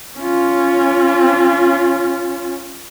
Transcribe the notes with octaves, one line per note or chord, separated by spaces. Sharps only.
C#4 F4